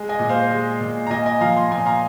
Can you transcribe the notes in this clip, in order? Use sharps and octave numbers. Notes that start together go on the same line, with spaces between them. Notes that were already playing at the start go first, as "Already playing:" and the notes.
Already playing: G#3
D#5 G#5
A#2
C5 F5
G#3
A#2
A#5
A#2 D#5 G#5
D#5 G#5
F3 F5 A#5
G#5 C6
A#2 G#5 C6
F5 A#5